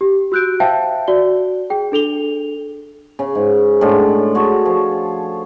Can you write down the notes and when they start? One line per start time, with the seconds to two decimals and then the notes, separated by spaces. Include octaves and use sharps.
0.01 G4
0.32 F#4 E6 F#6 G6 D7
0.60 C5 E5 F5 G5 A5
1.08 F#4 D5 G7
1.70 G#4 G5
1.92 D4 A4 F7 G7
3.19 C#3
3.35 G#2
3.81 A2 D3 G#3 A4
4.35 F#4 G#4 A4 C#5
4.65 F3 F5